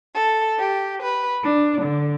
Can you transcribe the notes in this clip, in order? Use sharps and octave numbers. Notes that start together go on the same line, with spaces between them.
A4
G4
B4
D4
D3